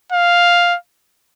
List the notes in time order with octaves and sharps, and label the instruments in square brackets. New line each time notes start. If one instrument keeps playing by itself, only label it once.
[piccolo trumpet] F5